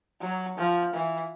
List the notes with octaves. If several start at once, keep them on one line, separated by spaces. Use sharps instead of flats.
F#3
F3
E3